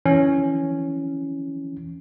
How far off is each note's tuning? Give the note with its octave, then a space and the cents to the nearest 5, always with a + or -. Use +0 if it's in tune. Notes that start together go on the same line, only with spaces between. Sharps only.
E3 +0 C#4 +0